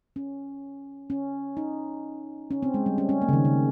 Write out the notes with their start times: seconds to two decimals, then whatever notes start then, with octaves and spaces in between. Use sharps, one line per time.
0.16 C#4
1.10 C#4
1.57 D#4
2.51 C#4
2.63 C4
2.74 G#3
2.86 G3
2.98 C#4
3.09 C#4
3.22 A#3
3.29 C#3
3.33 D#3
3.45 C#3